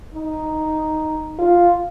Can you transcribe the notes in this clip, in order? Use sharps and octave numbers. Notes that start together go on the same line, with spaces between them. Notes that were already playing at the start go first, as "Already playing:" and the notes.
D#4
F4